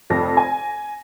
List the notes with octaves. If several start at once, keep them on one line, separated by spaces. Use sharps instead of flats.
F1 F2 A#6
G#5